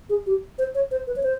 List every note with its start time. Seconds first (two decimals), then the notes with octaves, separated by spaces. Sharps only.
0.10 G#4
0.27 G4
0.58 C5
0.75 C#5
0.91 C5
1.07 B4
1.16 C#5
1.23 C5